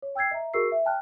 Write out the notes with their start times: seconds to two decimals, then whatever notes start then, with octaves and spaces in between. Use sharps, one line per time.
0.02 C#5
0.15 G5 E6 G6 G#6 C7
0.31 D#5 E5 A#5
0.54 F#4 G#4 A#4 C#6 E6 C7
0.72 E5
0.86 G5 A5 F6 F#6